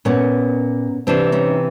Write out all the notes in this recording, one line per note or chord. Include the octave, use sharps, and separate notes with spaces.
A#2 B3 C#4
C3 E3 C4 D4
C#4 D#4